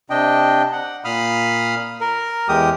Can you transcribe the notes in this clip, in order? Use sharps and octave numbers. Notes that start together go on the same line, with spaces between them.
C3 D4 D#5 G5
F#5
A#2 F5 B5 D#6 F6
A#4
E2 G#3 G4 D#6